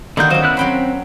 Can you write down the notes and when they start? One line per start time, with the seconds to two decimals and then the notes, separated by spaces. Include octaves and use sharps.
0.17 D3 D#3 G3 A#3 F#4 G6
0.30 F#3 A#3 C#4 F#4 C5
0.42 B3 E4 F#6
0.57 F#3 C4 G5 B5